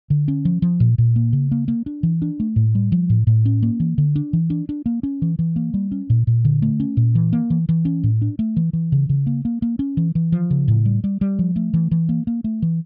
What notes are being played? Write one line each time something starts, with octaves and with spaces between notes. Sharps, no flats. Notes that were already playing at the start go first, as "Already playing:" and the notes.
D3
C#4
F3
F3
A#2
A#2
A#3
C#3
A#3
A#3
D4
E3
D4
A3
A2
G3
F3
A2
A2
C#4
A#3
E3
D3
D4
E3
D4
D4
A#3
C#4
E3
E3
A#3
G3
C#4
A#2
A#2
D3
A3
C#4
A#2
E3
A#3
E3
E3
C#4
A2
D4
A3
E3
E3
C#3
C#3
A#3
A#3
A#3
C#4
E3
E3
F3
C#3
A2
G3
G3
G3
F3
A3
E3
E3
A#3
A#3
A3
E3